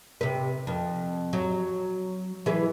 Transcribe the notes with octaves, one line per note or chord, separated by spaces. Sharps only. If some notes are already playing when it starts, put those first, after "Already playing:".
C3 B4
F2
F#3
E3 G#4 B4